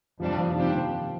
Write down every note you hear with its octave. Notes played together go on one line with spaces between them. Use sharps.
F2 C3 F3 G3 D4
F3
F3
C3 D#3 G3 D4 G4 C5
F3